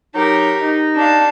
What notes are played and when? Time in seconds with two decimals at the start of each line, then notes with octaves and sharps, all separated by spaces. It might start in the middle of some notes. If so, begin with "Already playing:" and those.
0.15 F#3 D#4 G4 A#4
0.62 D#4
0.95 D4 F5